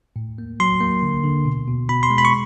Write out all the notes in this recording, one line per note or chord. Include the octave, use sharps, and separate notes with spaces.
A2
A#3
F#3 C6
A#3
D3
D3
B2
B2
B2 B5
C6
G#3
B5
C#6